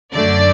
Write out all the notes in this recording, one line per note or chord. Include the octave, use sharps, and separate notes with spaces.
F#2 D3 A3 D5